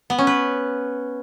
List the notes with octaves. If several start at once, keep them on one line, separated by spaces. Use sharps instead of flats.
B3
C#4
B4